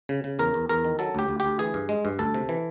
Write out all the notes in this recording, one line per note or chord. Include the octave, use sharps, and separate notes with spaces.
C#3
C#3
E2 A#4
E2
E2 A#4
D#3
F#3 A4
D2 G4
D2
D2 G4
E3 G#4
G2
G#3
G2
D2 A4
C3
E3